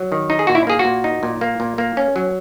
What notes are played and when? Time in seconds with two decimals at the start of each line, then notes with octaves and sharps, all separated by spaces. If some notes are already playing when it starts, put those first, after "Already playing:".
Already playing: F#3
0.12 D#3
0.30 D#4
0.39 G#4
0.47 A#2 F#4
0.55 E4
0.67 A#3 G#4
0.79 F#4
0.85 A#2
1.04 D#4
1.23 A#2
1.41 A#3
1.60 A#2
1.78 A#3
1.97 C#4
2.16 F#3